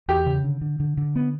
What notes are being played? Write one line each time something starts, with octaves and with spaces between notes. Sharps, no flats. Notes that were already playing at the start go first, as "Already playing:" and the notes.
E2 G4
C#3
D3
D3
D3
D3
B3